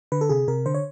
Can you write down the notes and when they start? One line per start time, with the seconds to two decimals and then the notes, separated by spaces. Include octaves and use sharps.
0.12 D3 B4
0.21 A4
0.29 C3 G#4
0.48 C3 A#4
0.66 D3 C5
0.74 C#5